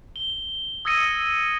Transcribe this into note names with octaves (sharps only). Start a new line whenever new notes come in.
G7
D#6 E6 G#6 A#6 C#7 D#7